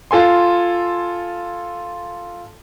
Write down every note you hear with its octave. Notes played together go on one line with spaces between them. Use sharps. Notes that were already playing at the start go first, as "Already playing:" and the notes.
F4 A4 G#5 C6